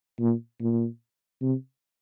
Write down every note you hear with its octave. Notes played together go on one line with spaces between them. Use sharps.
A#2
A#2
C3